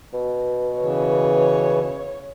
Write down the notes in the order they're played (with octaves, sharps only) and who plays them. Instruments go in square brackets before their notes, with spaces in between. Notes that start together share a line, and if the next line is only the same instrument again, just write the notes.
[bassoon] B2
[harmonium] C#3 E3 [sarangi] C#5